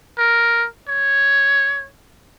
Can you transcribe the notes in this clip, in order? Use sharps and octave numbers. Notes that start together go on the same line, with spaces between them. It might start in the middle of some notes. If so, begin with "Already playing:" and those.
A#4
C#5